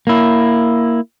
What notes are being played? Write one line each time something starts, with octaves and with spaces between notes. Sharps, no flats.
A#3 E4